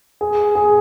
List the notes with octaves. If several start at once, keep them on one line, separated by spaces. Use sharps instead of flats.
G#4
G#4